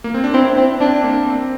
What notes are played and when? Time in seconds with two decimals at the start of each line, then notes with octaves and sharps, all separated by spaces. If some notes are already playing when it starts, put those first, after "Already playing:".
0.04 A#3
0.14 C4
0.24 D4
0.34 C4 E4
0.57 C4 D4
0.80 C4 D4
1.04 A#3
1.26 C4